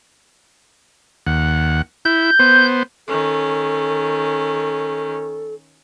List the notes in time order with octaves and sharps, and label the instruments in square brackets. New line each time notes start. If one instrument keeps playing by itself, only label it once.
[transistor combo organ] D#2 F#5
[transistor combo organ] E4 [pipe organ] G6
[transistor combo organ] B3 C5
[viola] D#3 C#4 [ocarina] A4